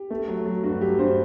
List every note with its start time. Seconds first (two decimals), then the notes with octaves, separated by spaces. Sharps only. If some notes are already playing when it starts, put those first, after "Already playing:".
Already playing: G4
0.10 A3
0.28 F#3
0.46 F#3
0.63 G2 F#4
0.81 F#3 G4
0.99 G2 C5